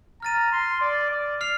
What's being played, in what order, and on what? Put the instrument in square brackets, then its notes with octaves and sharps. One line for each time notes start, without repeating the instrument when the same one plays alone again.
[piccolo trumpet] A#5 [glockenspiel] F6 A6 D#7
[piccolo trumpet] C6
D5
D5
[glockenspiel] F6 C7 F7